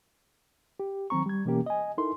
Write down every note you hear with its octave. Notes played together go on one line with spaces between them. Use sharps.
G4
D#3 F#3 C4 A#5 C#6
G3 G#6
B2 E3 A#3 C#4 G4 A#4
D#5 G#5
D#4 E4 A4 A#4 C6